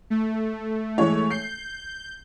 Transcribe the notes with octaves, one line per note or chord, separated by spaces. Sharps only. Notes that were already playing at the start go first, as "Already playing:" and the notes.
A3
E3 G#3 C#5
G6 C7